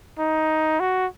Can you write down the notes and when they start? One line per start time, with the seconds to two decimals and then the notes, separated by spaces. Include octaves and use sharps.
0.19 D#4
0.80 F#4